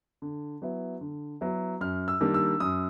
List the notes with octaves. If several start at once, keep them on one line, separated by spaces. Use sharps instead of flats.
D3
F#3 B3 E4
D3
F#3 B3 E4
F#2 F6
E6
D#3 G3 A#3 D4
E6
F#2 D#6